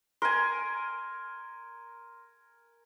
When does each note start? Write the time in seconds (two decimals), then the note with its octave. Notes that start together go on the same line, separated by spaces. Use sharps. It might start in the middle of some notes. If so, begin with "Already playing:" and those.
0.22 A#4 G#5 C6